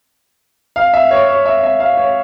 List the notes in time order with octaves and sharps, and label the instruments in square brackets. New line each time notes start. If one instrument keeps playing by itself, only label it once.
[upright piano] F5
E5
C#5
C#5
E5
E5
F5
C#5